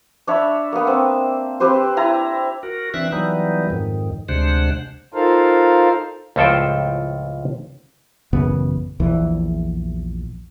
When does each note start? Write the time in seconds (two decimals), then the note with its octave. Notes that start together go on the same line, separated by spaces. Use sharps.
0.27 D4 C#5 E5 B5
0.72 A#3 B3
0.87 C4
1.60 C4 G4 B4 C5
1.97 E4 A#5
2.63 F#4 A#4
2.94 E3 C4 D4 E5 F#6
3.12 E3 F#3 G3 B3 D#4
3.70 F2 G#2 D#3
4.29 D2 C3 G#3 D4 C5 F#5
5.14 D#4 F4 A4 A#4 C5 F5
6.36 C#2 A2 F3 A4 C5 G5
8.33 A1 F#2 C#3 B3
9.00 A#1 E2 E3